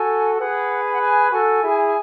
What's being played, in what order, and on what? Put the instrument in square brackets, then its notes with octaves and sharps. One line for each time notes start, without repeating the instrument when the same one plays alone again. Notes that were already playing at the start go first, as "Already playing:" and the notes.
Already playing: [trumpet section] F#4 A4 [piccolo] G#5
[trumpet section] G#4 B4 [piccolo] F#5
[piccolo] G#5
F#5
G#5
[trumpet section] F#4 A4 [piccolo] G#5
[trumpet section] E4 G#4